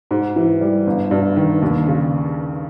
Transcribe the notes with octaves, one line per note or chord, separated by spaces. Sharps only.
G#2
E3
G3
G1
G2
D#3
D#2
C#3